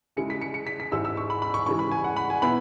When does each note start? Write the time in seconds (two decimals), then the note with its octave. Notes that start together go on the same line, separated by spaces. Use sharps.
0.16 C#3 G#3 E4 C#7
0.30 B6
0.41 C#7
0.54 C#7
0.67 B6
0.80 B6
0.92 G#2 G#3 E4 E6
1.05 E6
1.17 C#6
1.30 B5
1.42 B5
1.54 C#6
1.66 C#3 E3 G#3 C#6
1.79 B5
1.91 G#5
2.04 F#5
2.16 B5
2.30 G#5
2.42 B2 B3 E4 B5